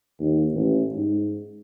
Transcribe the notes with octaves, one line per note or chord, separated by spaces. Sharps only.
D#2
A1
G#2